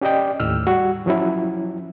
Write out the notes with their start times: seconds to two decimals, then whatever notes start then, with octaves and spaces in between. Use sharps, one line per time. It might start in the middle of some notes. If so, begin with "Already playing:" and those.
0.01 C#4 G4 D5 D#5 G5
0.40 D#2 A2 E6 F6
0.67 G3 F#4
1.06 F3 F#3 C#4 E4